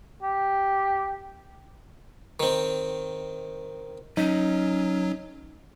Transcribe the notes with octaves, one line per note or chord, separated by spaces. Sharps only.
G4
D#3 C4
F#3 C#4 D#4